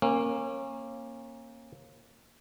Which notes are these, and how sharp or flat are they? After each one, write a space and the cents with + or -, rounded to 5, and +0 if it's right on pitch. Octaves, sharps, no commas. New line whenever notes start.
A#3 +0 C#4 -30